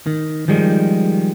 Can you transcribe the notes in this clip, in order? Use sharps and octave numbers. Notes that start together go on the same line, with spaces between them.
D#3
D#3 F3 G3 G#3